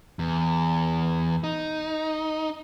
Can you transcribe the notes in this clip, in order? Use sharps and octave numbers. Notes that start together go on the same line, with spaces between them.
E2
D#4